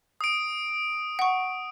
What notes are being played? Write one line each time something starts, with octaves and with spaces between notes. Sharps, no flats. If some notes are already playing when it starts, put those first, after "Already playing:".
D#6 D7
F#5 C#6